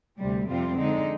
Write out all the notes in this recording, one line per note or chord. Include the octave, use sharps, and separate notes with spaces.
D2 C3 G3
F2 C3 G3 C4 F4
D3 G#3 D#4